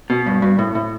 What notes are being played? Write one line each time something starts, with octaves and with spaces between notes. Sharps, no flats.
B2
G2
G2
A2
A2